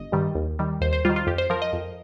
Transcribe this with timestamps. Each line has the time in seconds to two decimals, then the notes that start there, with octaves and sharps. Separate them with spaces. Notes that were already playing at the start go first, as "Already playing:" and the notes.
Already playing: G1 D#5
0.12 G2 D#3 G3
0.35 D#2
0.59 D#3 G3
0.81 D#2 C5
0.93 C5
1.05 D#3 G3 F4
1.16 F4
1.27 F2 G4
1.38 C5
1.50 F3 A#4
1.62 D#5
1.73 F2